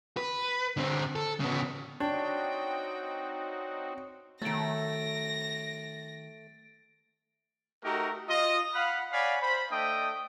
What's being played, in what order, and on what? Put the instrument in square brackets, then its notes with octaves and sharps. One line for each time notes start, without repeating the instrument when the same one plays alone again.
[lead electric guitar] B4
D3 C4
A4
C#3 B3
[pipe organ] C4 D#4 F#4 [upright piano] D4 [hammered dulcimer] C#5 [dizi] G5
[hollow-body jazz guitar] D#3 F#3 [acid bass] A3 [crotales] A6 D7 [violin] A#6
[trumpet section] A3 D#4 F#4 G4 A#4
F4 D#5
F5 F#5 B5
C#5 D5 F5 F#5 G#5 B5
C5 B5
A3 D4 D#5 G5 D#6